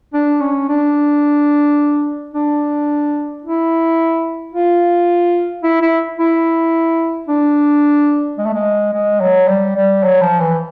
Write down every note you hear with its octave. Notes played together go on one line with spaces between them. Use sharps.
D4
C#4
D4
D4
E4
F4
E4
E4
E4
D4
G#3
A3
G#3
G#3
F#3
G3
G3
F#3
F3
E3